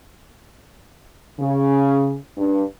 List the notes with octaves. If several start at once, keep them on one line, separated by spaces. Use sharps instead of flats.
C#3
G2